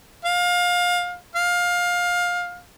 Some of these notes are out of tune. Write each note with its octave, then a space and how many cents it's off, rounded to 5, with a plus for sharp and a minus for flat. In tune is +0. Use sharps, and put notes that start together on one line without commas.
F5 +25
F5 +20